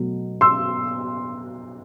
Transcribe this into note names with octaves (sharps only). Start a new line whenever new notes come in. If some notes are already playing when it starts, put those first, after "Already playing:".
Already playing: B2 F#3 A3
C6 E6